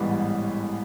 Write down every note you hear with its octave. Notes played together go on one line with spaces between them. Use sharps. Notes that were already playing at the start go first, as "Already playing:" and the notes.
Already playing: A1 G#2 E3 G3 B3